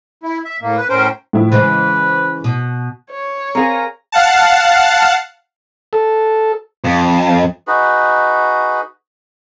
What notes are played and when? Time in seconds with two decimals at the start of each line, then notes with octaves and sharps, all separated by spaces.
0.23 E4
0.45 E5
0.62 A2 A#3
0.77 B4
0.89 A2 C#4 A#4 C5 G5
1.33 A2 F3 E4
1.52 C#3 E3 G#3 B4 C5
2.44 B2
3.11 C#5
3.55 C4 G#4 A#4 F5 G#5 A#5
4.12 F5 F#5 A5
5.93 A4
6.84 F2
7.67 D#4 F#4 G#4 B4